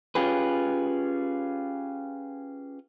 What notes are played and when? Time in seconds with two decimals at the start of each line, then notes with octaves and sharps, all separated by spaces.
0.15 C#4 F4 G4 G#4 B4